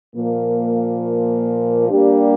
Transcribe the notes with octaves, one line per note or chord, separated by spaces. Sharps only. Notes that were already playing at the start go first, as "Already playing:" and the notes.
A#2 F3 A#3
G3 A#3 D4 G4